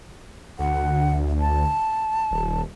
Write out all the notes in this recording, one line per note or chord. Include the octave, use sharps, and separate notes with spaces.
D2 F#5
A5
D#1